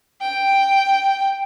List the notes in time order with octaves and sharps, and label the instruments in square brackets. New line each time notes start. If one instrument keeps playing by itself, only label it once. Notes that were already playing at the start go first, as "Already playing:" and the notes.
[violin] G5